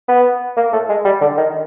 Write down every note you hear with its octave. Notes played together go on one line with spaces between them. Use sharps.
B3
A#3
A3
G#3
G3
D3
D#3